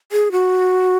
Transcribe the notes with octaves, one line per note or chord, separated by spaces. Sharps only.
G#4
F#4